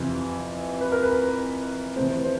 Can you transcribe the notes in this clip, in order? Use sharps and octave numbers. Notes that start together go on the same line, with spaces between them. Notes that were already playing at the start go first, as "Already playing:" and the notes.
Already playing: F2 C3 E3
B4
A#4
B4
C3 E3 A3 C4 C5
B4
C5